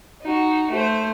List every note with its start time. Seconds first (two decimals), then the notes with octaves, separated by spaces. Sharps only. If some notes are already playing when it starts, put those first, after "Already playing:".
0.21 D#4 F#4
0.70 A3 C5